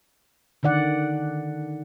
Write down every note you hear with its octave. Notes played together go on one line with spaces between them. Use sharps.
D3 D#3 D5 F#5